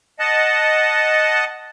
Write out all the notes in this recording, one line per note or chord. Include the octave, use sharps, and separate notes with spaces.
D#5 F#5 A5